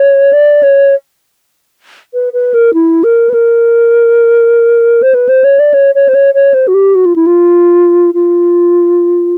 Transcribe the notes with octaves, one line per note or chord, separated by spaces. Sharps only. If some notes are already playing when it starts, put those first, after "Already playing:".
Already playing: C#5
D5
C#5
B4
B4
A#4
E4
A#4
B4
A#4
C5
B4
C5
C#5
D5
C#5
C#5
C5
C#5
C#5
C5
F#4
G4
F#4
F4
E4
F4
F4